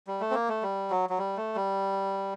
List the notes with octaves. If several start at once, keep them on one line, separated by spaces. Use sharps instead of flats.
G3
A3
C4
A#3
A3
G3
F#3
F#3
G3
A3
G3